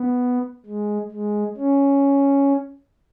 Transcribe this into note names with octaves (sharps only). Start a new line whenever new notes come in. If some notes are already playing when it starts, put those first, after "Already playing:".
Already playing: B3
G#3
G#3
C#4